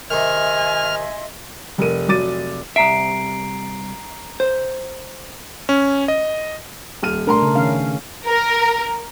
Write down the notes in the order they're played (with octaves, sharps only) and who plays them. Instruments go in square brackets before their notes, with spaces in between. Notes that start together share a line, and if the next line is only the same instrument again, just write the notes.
[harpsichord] C3 D#3 [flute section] D#5 E5 C6 [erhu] G#5 [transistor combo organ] F6
[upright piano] F1 A#4 D#7
F1 F#3 D6 A6 D#7
[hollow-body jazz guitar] C2 E5 [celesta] A#5 C7 D7
[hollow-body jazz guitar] C5
[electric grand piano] C#4
D#5
[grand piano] D#1 F6 D#7
[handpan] B2 A3 D4 [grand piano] A#4 A#5 C6
[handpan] C#3
D#3 C#4 F5
[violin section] A#4